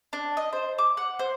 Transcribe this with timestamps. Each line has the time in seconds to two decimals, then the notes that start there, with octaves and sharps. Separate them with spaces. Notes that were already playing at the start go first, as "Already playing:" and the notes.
0.13 D4
0.37 D#5
0.53 C5
0.78 D6
0.97 F#5
1.19 C5